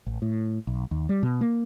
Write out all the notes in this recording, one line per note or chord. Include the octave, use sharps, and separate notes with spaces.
A1
A2
B1
D#2
G3
B2
A#3